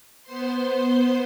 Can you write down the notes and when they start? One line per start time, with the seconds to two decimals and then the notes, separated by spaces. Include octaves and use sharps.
0.23 B3 C5 C6